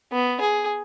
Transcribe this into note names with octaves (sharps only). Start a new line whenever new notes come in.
B3
G#4